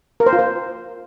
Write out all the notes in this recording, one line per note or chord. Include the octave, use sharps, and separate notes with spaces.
A#4
C5
F4
C5